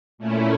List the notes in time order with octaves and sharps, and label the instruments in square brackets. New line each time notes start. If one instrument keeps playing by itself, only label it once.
[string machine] A#2 A3 C#4 E4